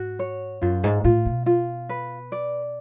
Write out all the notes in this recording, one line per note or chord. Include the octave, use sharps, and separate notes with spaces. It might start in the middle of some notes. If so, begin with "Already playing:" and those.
Already playing: G#2 F#4
C#5
F#2 F4
G#2
A2 F4
B2
F4
B4
D5